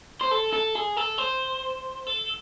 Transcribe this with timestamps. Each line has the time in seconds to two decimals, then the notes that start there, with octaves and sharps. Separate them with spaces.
0.21 C5
0.32 A4
0.53 A4
0.75 G#4
0.97 A4
1.18 C5
2.07 A4